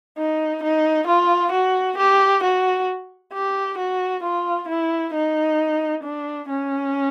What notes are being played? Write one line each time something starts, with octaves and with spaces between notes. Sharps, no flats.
D#4
D#4
F4
F#4
G4
F#4
G4
F#4
F4
E4
D#4
D4
C#4